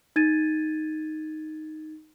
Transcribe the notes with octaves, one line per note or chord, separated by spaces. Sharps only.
D#4 G#6 A6 D#7